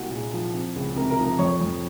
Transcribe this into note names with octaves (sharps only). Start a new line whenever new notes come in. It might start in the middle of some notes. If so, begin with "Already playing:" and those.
Already playing: C2 A#3 F#4 F#5
A#2 G#4 G#5
F3
C4
C#2
C3 A#4 A#5
A#4 A#5
F3
A#4 A#5
F2 C#5 C#6
F2